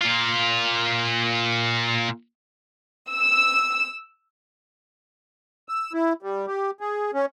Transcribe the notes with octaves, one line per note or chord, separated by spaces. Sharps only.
A#2 F4
E6
E6
E4
G3
G4
G#4
C#4